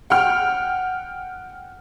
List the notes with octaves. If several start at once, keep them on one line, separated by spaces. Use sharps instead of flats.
F#5 G5 F6